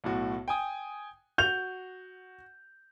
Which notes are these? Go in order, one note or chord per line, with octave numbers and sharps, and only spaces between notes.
B1 A2 F#4
G5 G#5 D#6
F#4 G6 F7